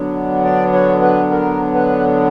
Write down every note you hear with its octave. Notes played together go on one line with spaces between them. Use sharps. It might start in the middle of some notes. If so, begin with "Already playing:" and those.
Already playing: D3 F#3 B3 D4
D5
C#5
B4
A#4
B4